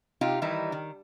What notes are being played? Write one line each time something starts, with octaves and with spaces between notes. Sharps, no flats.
C3 D#4 F4 G4
D#3 E3 G3 D#4 E4
D#3